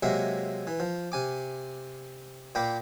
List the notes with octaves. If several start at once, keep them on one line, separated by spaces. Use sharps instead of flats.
C3 F#3 G#3 A#3 E5
E3
F3
C3 G#5 D6
A#2 A#3 G5 B5 D6